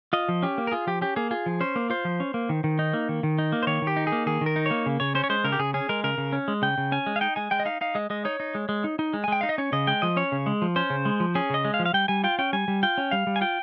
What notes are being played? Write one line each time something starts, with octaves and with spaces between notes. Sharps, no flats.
F4 D#5
F3
C#4 G4
A#3
A#4
F4 G#4
F3 G4
C#4 G4
A#3 G#4
F4 G#4
F3
C#4 C5
A#3
F4 C5
F3
C#4
A#3
D#3
D#3
D#4
A#3
D#3
D#3
D#4
A#3
C5
D#3 C#5
D#3
G4
D#4
G#4
A#3
D#3 G#4
D#3 A#4
D#4
A#3 C#5
C#3
C#3 C#5
C#4 C5
C#5
G#3 C5
C#3 A#4
G4
C#3 G#4
C#4 G#4
G#3 A#4
C#3 A#4
C#3
C#4
G#3
C#3 G5
C#3
C#4 G#5
G#3
F5
D#4 G5
G#3 G#5
G#3 G5
D#5
D#4 F5
D#4 F5
G#3 D#5
G#3 D#5
D#4 C#5
D#4
G#3
G#3
D#4
D#4
G#3
G#5
G#3 G5
D#4 F5
D#5
C#4 C#5
C#3 D#5
G#3 G5
F3 D#5
C#4 C#5
C#3
G#3
F3
C#4 C5
C#3
G#3
F3
C#4 G#4
C#3 D#5
G#3
F5
F3
F5
G3 G5
G3 G#5
F4 G5
C#4 G5
G3 G#5
G3
F4 G5
C#4
G3 F5
G3
G#5
F4 G5